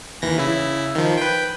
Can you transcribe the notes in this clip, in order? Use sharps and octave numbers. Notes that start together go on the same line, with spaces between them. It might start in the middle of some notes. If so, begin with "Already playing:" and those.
D#2 E3 A#6
C#3 E4
D#3 F3
B4 G5